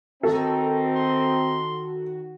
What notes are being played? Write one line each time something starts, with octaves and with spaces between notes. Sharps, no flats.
D#3 C4 D#4 F#4 A4
C6